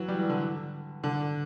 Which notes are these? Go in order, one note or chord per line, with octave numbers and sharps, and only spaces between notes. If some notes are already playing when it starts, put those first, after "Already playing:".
Already playing: E3 F#3
G3
E3
D3
D3